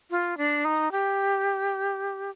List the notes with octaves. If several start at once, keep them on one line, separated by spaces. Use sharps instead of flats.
F4
D4
D#4
G4